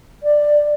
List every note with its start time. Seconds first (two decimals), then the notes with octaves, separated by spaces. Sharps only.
0.23 D5